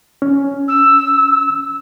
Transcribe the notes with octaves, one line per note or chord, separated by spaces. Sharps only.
C#4
E6